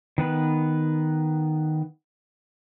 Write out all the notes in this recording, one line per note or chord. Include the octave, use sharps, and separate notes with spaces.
D#3 B3 B4